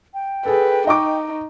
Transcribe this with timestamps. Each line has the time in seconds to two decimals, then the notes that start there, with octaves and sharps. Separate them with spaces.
0.14 G5
0.46 G#4 A4 B4
0.87 D#4 D#5 C#6 D6